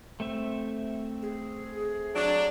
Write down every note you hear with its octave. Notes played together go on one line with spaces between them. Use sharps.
A3 C4 E5
G#4
F#3 D4